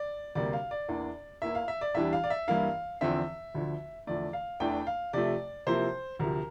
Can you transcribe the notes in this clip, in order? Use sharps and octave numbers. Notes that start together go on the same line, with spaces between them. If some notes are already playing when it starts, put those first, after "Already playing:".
Already playing: D5
D2 C3 G3 A#3 D5
F5
D5
E2 E3 A#3 D4
E2 E3 A#3 E4 E5
F5
E5
D5
E2 E3 G3 D4 E5
F5
D5
E5
G2 E3 A#3 E4 F5
E2 D3 F3 C4 E5
D2 D3 F3
E2 D3 F3 A3 D5
F5
E2 E3 A3 D4 G5
F5
C3 F3 A3 D5
C3 F3 A#3 E4 C5
D2 C3 F3 A#4